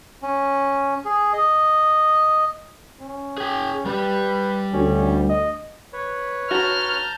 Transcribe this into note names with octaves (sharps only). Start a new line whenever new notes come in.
C#4
G#4
D#5
C#4
G#4 G5
G3 G4 B4
D2 C#4
D#5
B4 C#5
F#4 A5 A#5 F6 G6